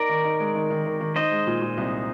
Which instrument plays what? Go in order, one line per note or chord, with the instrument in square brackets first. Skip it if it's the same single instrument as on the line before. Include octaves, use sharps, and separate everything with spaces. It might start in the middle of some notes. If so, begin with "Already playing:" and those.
Already playing: [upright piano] D#4 [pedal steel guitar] A#4 D5
[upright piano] D#3
D#4
G#3
D#3
D#3
D#3
D#3
[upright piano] D#4 [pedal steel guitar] C5 D#5
[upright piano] G#3
A#2
A#2
C2